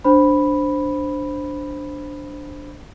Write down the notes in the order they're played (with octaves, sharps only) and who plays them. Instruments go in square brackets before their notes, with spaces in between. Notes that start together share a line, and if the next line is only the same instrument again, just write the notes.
[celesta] D4 C5 B5